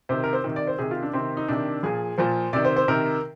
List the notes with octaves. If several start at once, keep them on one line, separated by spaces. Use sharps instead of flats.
C3 D#3 C5
A#4
C5
C3 D#3
D5
C5
C3 D#3 G#4
F4
D4
C3 D#3 C4
D#4
C3 D#3 D4
A#2 F3 G#4
A#2 F3 C5
C3 D#3 D5
C5
C5
C3 D#3 A#4